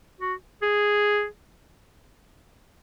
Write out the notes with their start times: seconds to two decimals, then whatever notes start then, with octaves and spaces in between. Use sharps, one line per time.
0.21 F#4
0.62 G#4